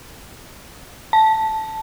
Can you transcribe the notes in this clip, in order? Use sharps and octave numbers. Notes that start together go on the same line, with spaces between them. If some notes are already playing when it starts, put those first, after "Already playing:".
A5